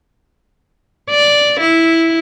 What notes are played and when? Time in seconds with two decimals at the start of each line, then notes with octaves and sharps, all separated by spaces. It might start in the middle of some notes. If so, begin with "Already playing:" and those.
1.10 D5
1.60 E4